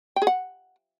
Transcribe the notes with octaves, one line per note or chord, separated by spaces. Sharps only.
G5
G#4
F#5